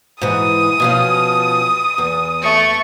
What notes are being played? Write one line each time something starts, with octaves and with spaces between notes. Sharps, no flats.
G#2 E3 D#6
B2 F3 C#4
E2
A3 C#6